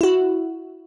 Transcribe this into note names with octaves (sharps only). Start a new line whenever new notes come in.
E4 F#4